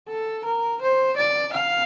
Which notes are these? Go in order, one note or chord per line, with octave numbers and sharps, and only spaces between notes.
A4
A#4
C5
D5
F5